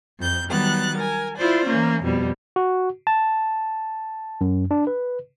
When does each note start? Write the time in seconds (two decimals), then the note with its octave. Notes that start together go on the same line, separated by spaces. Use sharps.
0.21 F2 F3 G6
0.51 D#3 F#3 G3 B3 F#6 A6
0.98 A#4 G#5
1.37 E4 F4 C5 D5
1.66 E3 A#3 C#4
2.03 F2 B2 G3
2.56 F#4
3.07 A5
4.41 F#2
4.71 D4
4.87 B4